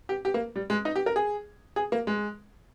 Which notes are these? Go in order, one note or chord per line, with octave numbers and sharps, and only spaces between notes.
G4
G4
A#3
G3
G#3
D#4
G4
A#4
G#4
G#4
A#3
G#3